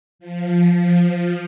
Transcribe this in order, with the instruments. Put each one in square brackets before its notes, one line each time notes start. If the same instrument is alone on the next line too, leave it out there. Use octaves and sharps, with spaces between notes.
[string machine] F3